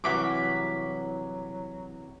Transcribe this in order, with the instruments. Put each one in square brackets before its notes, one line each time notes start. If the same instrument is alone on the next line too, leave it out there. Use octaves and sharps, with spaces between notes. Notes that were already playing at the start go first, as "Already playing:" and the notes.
[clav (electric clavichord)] C2 E3 F#4 [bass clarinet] F#3 [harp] D6 B6